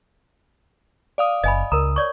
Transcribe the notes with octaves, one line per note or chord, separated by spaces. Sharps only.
D5 F5 D#6
F#1 D#5 G#5 B5
C#2 A#4 A#5 D#6
C#5 D5 C#6